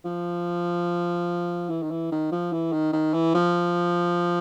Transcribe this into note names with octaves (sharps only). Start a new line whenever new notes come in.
F3
E3
D#3
E3
D#3
F3
E3
D#3
D#3
E3
F3